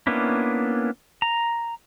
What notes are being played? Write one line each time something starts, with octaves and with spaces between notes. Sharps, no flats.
A#3 B3 C#4 D4 E4
A#5